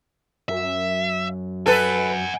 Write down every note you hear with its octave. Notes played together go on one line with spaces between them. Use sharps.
F#2 E5
A4 B4 F#5 G#5